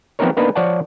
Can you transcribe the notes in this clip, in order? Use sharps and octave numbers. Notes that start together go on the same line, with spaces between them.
F3 B3 C4 D#4 A#4 C#5
A#3 B3 D4 D#4 B4
F3 C#5 D5 F#5 A5